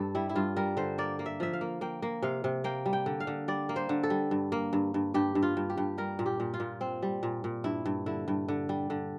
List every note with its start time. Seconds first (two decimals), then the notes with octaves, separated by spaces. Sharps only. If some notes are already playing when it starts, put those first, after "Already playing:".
Already playing: G2 A4
0.15 G3 E4
0.29 E4
0.35 G2 F4
0.56 G3 A#4
0.77 D3 C5
0.98 A#3 D5
1.19 A#3
1.26 E5
1.40 F3 E5
1.53 F5
1.61 A#3
1.81 A#3 G5
2.02 A#3
2.22 C3 F5
2.44 C3
2.64 A#3 G5
2.86 G3
2.93 G5
3.06 D3
3.20 F5
3.27 D3
3.48 G3 D5
3.69 A#3
3.76 C5
3.89 D3
4.03 A4
4.10 G3
4.31 G2
4.52 A#3
4.73 G2
4.94 G2
5.14 G2 G4
5.35 G2
5.42 F4
5.57 G2
5.70 G4
5.77 G2
5.98 G3 A#4
6.19 A#2
6.26 G4
6.40 A#2
6.54 F4
6.60 A#2
6.81 C4
7.02 G3
7.23 A#2
7.44 A#2
7.64 G2 E4
7.86 G2
8.06 D3 E4
8.28 G2
8.48 D3
8.69 G3
8.90 D3